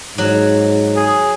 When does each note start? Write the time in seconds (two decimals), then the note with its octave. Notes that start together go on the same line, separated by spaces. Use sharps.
0.18 G#2 F#3
0.96 G#4